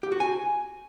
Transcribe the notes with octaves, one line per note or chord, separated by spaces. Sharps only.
G4
F#4
G#5